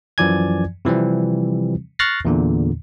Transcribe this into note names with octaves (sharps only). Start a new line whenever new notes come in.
F#2 E3 F3 D5 G#5 G#6
C3 E3 F3 G3 C4
C#6 F6 F#6 A6 A#6 C7
E2 A#2 D3